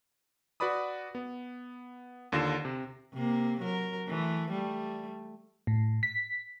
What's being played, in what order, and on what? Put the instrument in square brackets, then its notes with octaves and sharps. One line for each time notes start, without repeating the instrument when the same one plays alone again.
[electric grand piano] F#4 B4 D5 B5 D#6
B3
D#2 D3 F4 A#6 C7 E7
C3
[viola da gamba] C3 A#3
F#3 A#4
E3 A3
G3 A3
[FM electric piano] A2
B6